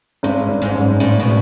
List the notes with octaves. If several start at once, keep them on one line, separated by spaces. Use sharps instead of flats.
G#1 G2
G#1
G#2
F#2
G#1 A2
B2